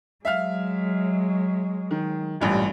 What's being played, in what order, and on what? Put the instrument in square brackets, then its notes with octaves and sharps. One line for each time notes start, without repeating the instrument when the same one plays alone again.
[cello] F#3 G#3 [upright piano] E5 F5 F6
[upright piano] D#3
A1 G2 A#2